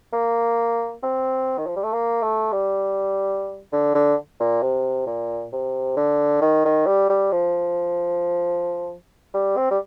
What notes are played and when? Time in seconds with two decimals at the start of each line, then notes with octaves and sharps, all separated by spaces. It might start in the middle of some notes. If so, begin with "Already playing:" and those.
0.13 A#3
1.03 C4
1.58 D#3
1.67 F3
1.76 G3
1.83 A3
1.93 A#3
2.23 A3
2.52 G3
3.73 D3
3.95 D3
4.40 A#2
4.62 C3
5.07 A#2
5.52 C3
5.96 D3
6.42 D#3
6.65 D#3
6.87 G3
7.10 G3
7.32 F3
9.34 G3
9.57 C4
9.71 G3